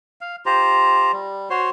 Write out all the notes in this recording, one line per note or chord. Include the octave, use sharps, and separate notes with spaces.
F5
F4 G4 C5 A#5
G3
F#4 C5 C#5 C6